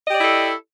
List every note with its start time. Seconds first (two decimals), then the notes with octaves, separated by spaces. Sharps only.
0.07 D#5
0.11 G4
0.15 D5
0.18 E4
0.22 A4